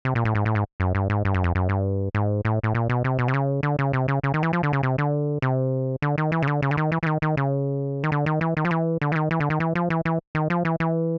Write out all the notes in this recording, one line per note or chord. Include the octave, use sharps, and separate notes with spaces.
C3
A#2
A2
G#2
A2
G#2
F#2
G2
G#2
G2
F#2
F2
F#2
G2
G#2
A2
A2
A#2
B2
C3
B2
C3
C#3
D3
C#3
C3
C#3
C#3
D#3
E3
F3
D3
C#3
C3
D3
C3
D3
D#3
E3
C#3
D3
C#3
D3
D#3
E3
E3
D#3
D#3
C#3
D#3
D3
D#3
E3
D#3
F3
E3
D3
E3
D#3
E3
D3
D#3
E3
F3
E3
E3
D#3
F3
E3
E3